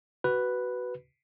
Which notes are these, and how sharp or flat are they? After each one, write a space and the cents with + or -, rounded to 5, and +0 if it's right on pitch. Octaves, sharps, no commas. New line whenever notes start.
F#4 +15 B4 +0